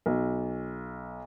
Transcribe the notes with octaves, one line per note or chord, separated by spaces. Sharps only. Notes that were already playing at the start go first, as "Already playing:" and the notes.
B1